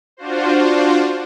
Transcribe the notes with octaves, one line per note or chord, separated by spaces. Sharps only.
D4 F4 F#4 C5